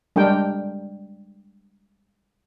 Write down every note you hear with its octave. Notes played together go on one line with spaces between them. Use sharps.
G3 G#3 D4 A#4 G5